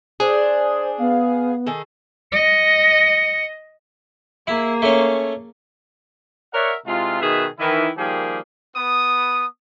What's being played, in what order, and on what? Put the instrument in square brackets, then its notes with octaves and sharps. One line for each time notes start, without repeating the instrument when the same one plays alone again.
[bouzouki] D4 [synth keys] G#4 [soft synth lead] C5
[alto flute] B3 [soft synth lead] F5
[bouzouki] D#3 G#4 A4
[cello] D#5 [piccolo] C#7
[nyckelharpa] A#3 G#4 [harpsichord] E4
[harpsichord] A3 C#4
[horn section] A#4 C#5 D5 E5 F#5
C3 G#3 E4 F4
B2 D#3 D#4 G#4 B4 E5
D#3 E3 E4
D#3 F3 G3 A#3 G4 G#4
[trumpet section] B3 D#6